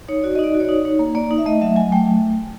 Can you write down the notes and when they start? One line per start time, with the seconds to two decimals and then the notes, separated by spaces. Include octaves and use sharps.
0.08 D#4 C#5
0.23 F#4 D5
0.35 D#5
0.39 D#4 D5
0.54 F#4
0.60 C#5
0.65 D5
0.69 D#4
0.85 D#4 C#5
0.99 A#3
1.15 A#3 D5
1.31 D#4
1.38 E5
1.46 A3 D#5
1.61 F#3 E5
1.76 F#3 G#5
1.92 A3 G5